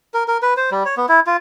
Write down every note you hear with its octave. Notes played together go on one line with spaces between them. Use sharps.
A#4
A#4
B4
C5
G3
C#5
B3
E4
F4